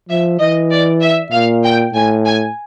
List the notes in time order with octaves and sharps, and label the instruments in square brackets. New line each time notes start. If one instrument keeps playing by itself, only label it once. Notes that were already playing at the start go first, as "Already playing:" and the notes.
[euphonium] F3 [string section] E5
[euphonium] E3 [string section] D#5
[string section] D5
E5
[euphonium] A#2 [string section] F5
[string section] G5
[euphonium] A2 [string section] G#5
[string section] G#5